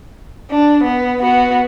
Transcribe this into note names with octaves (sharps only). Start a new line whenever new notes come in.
D4
B3
B3 F#4